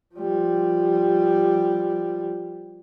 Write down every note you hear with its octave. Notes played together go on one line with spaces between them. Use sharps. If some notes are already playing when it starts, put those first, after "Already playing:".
F3 G3